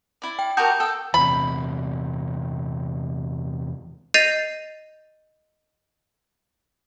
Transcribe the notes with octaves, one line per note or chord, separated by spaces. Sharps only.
E4 D5
G5
F#4 G4 A#4 A5 D#6 G6
A4 G5
E2 C3 B5
D#5 G6 A6 C7 D#7 F7